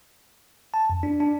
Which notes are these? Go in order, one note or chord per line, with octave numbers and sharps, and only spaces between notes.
A5
F2
D4
D4